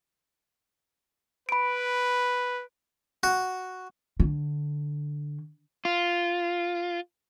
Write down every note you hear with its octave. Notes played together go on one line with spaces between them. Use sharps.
B4 B5 D7
F#4
D3
F4